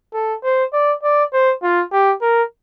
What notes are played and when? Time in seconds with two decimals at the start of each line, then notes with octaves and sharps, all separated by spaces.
0.14 A4
0.43 C5
0.73 D5
1.03 D5
1.33 C5
1.63 F4
1.92 G4
2.22 A#4